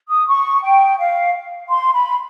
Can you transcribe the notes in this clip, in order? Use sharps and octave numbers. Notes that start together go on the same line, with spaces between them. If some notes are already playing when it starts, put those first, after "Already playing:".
D#6
C#6
G5
F5
C6
B5